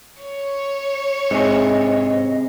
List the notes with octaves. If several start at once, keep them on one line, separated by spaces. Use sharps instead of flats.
C#5
G#2 C3 G#4 D#5